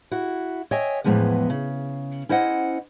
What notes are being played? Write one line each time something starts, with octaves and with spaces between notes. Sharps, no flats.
E4 F#4
C#5 D#5 E5 G5 G#5
E2 A2 E3 F3 G#3 B3
C#3
C#4 E4 C5 D#5 F#5